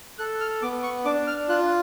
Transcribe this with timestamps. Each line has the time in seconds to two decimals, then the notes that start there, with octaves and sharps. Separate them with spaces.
0.18 A4 F#6
0.40 F6
0.62 B3 D6
0.83 C#6
1.05 D4 D6
1.27 F6
1.49 F4 F#6